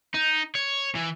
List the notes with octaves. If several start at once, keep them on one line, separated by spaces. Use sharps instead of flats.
D#4
C#5
E3